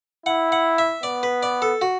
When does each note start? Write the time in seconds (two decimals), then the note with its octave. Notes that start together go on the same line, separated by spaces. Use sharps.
0.26 E4 F#5
0.52 F#5
0.78 E5
1.03 B3 D5
1.23 B4
1.43 D5
1.62 A4
1.81 F#4